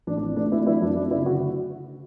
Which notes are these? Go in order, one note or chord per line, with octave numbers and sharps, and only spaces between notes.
A1 D4
D4
E3
A3 D4
A3 E4
F#3 E4
F#2 D4
A3 D4
C#3 E4
D3 F#4